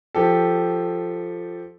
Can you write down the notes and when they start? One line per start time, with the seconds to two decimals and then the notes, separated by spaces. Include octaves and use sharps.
0.15 F3 G4 A4